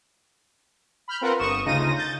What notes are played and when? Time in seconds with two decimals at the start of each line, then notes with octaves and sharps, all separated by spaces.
1.08 B5 F6 G6
1.21 C4 F4 A#4 B4 F#5 B5
1.39 G1 C#6 D#6 E7
1.65 D2 C#3 D#4 F4 A#6 D#7
1.96 G6 A6